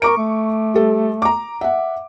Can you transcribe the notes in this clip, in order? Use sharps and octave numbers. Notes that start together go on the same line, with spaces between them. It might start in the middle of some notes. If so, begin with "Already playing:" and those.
A#4 C#6 D6 D7
A3
G3 A4
A#5 D6
E5 F#5